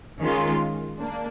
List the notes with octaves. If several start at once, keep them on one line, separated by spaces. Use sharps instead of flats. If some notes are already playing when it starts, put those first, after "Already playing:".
D#3 G#3 C#4 F4
A#3 D4